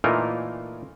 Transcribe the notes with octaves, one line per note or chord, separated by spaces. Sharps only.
A#2 E3 A3 D#4 F4 A#4